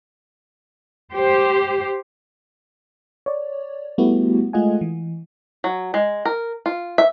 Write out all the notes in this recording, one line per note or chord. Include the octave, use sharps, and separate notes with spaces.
G4 C5
C#5 D5
G3 A3 B3 E4 F#4 G4
G#3 A3 F4 D#5 F#5 G#5
E3
F#3
G#3
A#4
F4
E5